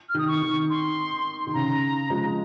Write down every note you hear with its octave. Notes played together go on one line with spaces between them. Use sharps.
F6
D#3
D#6
C#6
D#3
C6
D#3
C#3 A#5
F3 G#3